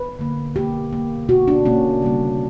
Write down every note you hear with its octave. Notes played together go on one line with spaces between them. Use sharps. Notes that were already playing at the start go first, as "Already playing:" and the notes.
Already playing: B4
D3 A#3
B2 A#3 G4
B2 A#3
B2 A#3 F#4
D4
B2 A#3 C#4
C#3 G3 A#3